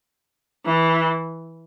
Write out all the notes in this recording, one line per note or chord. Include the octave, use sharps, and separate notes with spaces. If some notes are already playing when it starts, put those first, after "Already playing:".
E3